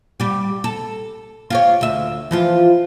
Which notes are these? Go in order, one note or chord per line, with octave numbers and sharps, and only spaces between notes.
G3 G4
A4
F4 G4 C#5
D2 E5
E3 F3 F4